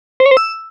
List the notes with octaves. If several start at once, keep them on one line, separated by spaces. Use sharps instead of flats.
C5
C#5
C5
E6